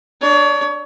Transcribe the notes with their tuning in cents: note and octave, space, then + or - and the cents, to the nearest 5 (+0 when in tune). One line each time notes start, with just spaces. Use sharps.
D4 +10 C#5 +30